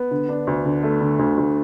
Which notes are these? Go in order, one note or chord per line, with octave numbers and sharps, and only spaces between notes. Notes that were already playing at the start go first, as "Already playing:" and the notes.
Already playing: B3
D3
D4
D2
D3
A3
D3
D2
D2